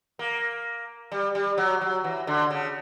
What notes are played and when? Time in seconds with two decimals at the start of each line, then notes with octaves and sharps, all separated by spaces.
0.19 A#3
1.12 G3
1.35 G3
1.58 F#3
1.81 F#3
2.04 E3
2.27 D3
2.50 C#3